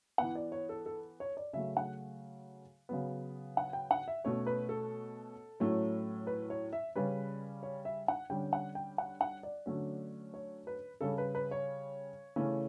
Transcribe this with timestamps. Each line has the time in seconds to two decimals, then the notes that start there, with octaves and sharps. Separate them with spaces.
0.18 E3 B3 F#5
0.35 D5
0.52 C#5
0.69 A4
0.86 A4
1.20 C#5
1.37 D5
1.53 C#3 F#3 A3 E5
1.77 F#5
2.89 C#3 F#3 B3
3.57 F#5
3.73 G5
3.91 F#5
4.08 E5
4.24 B2 A3 C#4 C#5
4.47 B4
4.69 A4
5.60 A2 F#3 A3 C#4
6.27 B4
6.50 C#5
6.73 E5
6.95 C#3 G3 C#4 B4
7.63 C#5
7.85 E5
8.08 F#5
8.30 D3 G3 C#4 G5
8.53 F#5
8.75 G5
8.98 F#5
9.21 F#5
9.43 D5
9.66 D3 F#3 A3 C#4
10.34 C#5
10.67 B4
11.01 C#3 G3 C#4 A4
11.18 B4
11.35 B4
11.51 C#5
12.36 C#3 E3 A3 C#4